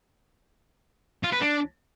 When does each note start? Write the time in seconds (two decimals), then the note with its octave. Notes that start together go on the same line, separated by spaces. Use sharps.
1.23 F4
1.32 B4
1.41 D4